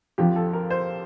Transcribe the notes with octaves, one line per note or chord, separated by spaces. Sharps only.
F2 D3 F3 G4
A4
A#4
C5